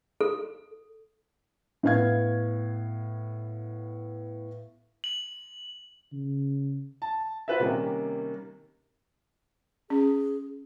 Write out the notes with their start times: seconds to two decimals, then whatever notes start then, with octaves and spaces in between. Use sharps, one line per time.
0.21 A4
1.83 A2 B3 F5 G#6
5.04 F#7
6.13 C#3
7.02 A5
7.48 F4 F#4 B4 C5 E5
7.60 C3 D#3 G3 A#3 C#4
9.90 C#4 G#4